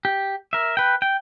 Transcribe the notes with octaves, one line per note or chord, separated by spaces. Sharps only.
G4
A#4 E5
B4 G5
G5